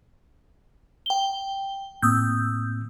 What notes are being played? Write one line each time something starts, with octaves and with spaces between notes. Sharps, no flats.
G5 G7
A2 A#3 C4 D#6 E6 G6